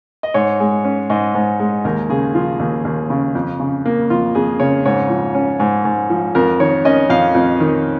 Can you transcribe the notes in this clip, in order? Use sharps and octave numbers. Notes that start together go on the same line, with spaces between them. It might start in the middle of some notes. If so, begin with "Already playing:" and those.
D#5
G#2 C#5
G#3
C#4
G#2 D#5
G#2
G#3
D#2 A#4
C#3 G#4
F3 F4
D#2
D#2
C#3
F2
C#3
A#3
F2 F4
F2 G#4
C#3 C#5
G#2 C#5
F3
C#4
G#2
G#2
F3
F2 A#4
D#3 C#5
C#4 D#5
F2 F5
F2
D#3